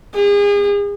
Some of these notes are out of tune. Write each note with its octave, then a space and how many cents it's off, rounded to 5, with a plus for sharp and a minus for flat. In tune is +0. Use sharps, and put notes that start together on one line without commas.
G#4 -35